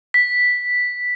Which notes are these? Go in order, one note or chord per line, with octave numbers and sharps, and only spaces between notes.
B6